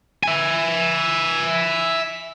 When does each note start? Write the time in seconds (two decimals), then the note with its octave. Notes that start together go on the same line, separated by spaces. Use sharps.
0.23 E5 G#5